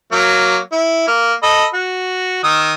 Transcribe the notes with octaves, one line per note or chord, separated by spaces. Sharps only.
F#3 A#3
E4
A#3
A4 D#5 B5
F#4
D#3 D#6 E6